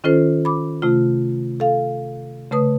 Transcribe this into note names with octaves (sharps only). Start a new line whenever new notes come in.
D#3 C#4 F4 A4 C5
B5 D6
C3 A3 F4
A4 F5
C#3 A3 B4 D#6